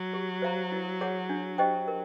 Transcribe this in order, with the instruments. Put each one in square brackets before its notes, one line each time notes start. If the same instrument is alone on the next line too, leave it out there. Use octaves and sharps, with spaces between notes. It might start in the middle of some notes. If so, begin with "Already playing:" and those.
Already playing: [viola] F#3
[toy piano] G4
C5 F5 A#5
E4
G#4 C#5 F#5
D4
G4 C5 D#5 G5
A#4